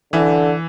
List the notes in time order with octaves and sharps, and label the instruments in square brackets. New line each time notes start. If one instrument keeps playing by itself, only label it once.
[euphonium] D3 [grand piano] E3